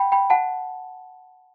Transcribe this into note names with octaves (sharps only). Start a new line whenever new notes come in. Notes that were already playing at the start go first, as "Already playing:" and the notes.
Already playing: F#5 G5 B5
G5 B5
F#5 A5